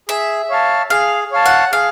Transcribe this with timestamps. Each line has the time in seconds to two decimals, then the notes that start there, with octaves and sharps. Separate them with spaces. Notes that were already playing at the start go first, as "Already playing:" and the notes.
0.09 G#4 E5
0.50 C#5 F5 A5
0.90 G#4 F5
1.32 C#5 F5 A5
1.46 F#5
1.72 G#4 F5